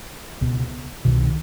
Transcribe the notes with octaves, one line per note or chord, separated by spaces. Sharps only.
C#2 B2
C2 B2 D#3